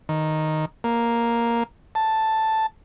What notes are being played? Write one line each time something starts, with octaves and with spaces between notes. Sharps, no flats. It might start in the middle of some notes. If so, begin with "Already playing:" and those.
D#3
A#3
A5